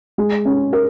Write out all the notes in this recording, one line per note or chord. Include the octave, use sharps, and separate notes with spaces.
G#3
C#4
A#4